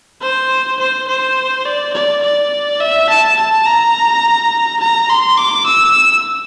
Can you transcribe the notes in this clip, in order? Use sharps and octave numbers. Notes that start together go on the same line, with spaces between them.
C5
C5
C5
D5
D5
D5
E5
A5
A5
A#5
A#5
C6
D6
E6